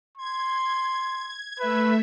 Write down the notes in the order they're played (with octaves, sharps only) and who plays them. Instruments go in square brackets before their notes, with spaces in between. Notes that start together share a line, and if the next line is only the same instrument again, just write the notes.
[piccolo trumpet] C6 [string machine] G#6
[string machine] A3 E5 [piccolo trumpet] B4